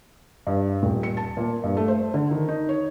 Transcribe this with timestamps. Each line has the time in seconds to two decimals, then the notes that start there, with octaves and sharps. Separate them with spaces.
0.47 G2
0.83 D#1
1.03 C#7
1.17 A5
1.37 A#2
1.64 G2
1.77 A3
1.88 C5
2.14 D3
2.31 D#3
2.48 D#4
2.69 C#5